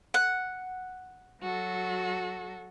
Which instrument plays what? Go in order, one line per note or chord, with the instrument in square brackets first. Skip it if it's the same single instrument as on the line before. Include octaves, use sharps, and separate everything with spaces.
[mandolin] F#5
[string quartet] F#3 F#4 A4